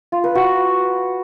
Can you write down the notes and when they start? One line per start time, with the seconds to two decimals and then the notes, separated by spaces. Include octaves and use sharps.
0.12 F4
0.24 B4
0.35 F#4